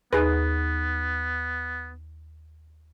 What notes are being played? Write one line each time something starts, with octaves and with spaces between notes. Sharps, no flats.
D#2 B3 D#4 G#4 B4